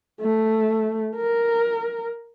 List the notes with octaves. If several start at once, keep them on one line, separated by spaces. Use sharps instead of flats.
A3
A#4